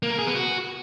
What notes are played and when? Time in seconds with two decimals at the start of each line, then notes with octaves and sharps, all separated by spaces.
0.03 A#3
0.11 A#4
0.19 G#4
0.27 B3
0.35 F#4